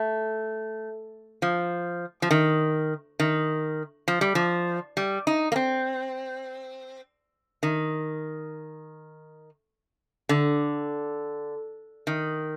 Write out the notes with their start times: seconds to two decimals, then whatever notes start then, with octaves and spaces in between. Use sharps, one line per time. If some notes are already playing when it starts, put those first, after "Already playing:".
Already playing: A3
1.42 F3
2.22 F3
2.31 D#3
3.20 D#3
4.08 F3
4.21 G3
4.35 F3
4.97 G3
5.27 D#4
5.52 A#3
5.56 C4
7.63 D#3
10.29 D3
12.07 D#3